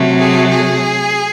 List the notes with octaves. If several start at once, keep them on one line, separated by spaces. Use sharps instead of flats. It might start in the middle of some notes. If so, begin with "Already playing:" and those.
Already playing: C3 F#3 A3
G#4
G#4